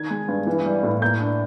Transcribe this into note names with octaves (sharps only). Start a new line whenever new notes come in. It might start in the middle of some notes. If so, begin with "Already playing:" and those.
Already playing: D#3 G#6
G#3
G2
E3
G3
A2
A#3 G6
D4